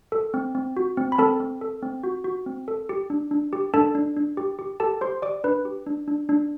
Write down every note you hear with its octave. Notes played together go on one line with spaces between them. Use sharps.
A4
C4
C4
F#4
C4
B5
C4 A4 A5
C4
A4
C4
F#4
F#4
C4
A4
G4
D4
D4
G4
D4 A4 A5
D4
D4
G4
G4
G4 A4 A5
G4 C5 C6
G4 D5 D6
D4 B4 B5
G4
D4
D4
D4